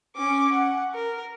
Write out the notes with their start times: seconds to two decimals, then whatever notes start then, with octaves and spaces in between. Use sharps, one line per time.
0.16 C#4 D6
0.52 F#5
0.94 A#4